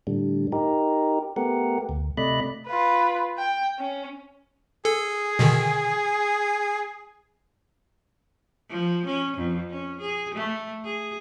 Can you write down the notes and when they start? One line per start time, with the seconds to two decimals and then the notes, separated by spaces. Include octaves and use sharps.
0.07 A2 D3 G3
0.52 D#4 G4 A#4
1.36 A3 B3 G4 A#4 F#5
1.89 D2
2.17 C3 A3 D5 D#5 B5 F#6
2.67 F4 B4
3.38 G5
3.79 C#4
4.85 G#4 A4
5.39 B2 D3 D#3
8.70 F3
9.06 C#4
9.37 F2
9.70 C#4
10.01 G#4
10.35 A3
10.85 G#4